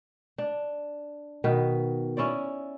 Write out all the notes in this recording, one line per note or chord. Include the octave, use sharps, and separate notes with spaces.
D4
B2 D#3 B4
C#4 E4 C#5 D5